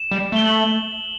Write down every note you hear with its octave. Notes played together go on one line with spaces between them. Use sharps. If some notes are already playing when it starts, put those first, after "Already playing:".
Already playing: E7
G3
A3 G7
F#7